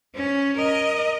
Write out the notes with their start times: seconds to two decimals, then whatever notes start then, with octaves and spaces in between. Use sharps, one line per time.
0.15 C#4
0.57 A#4 D#5